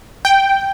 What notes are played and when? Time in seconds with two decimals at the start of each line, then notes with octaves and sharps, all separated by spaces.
0.25 G5